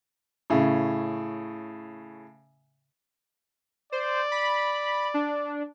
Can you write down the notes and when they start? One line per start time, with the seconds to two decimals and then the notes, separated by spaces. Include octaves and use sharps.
0.50 A2 C#3
3.92 C5 D5
4.32 B5
5.14 D4